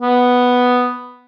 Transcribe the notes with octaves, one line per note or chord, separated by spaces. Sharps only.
B3